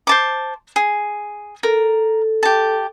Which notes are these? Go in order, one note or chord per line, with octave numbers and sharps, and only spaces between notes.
C5 A5 D6
G#4
A4 A#4
G4 A5